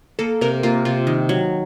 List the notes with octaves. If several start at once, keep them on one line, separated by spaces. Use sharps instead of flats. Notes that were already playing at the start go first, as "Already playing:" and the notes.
A#3 A4
C3 A#4
A#3 F4
C3 F4
D#3
F#3